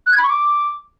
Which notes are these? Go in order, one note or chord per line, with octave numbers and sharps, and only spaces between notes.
F#6
G#6
B5
C#6
D6